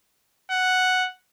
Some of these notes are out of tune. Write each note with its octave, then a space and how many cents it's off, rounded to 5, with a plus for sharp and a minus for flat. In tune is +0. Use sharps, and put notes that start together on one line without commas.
F#5 +0